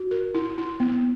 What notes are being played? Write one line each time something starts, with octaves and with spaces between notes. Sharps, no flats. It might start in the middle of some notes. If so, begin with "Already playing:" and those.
Already playing: F#4
A#4
E4
E4
B3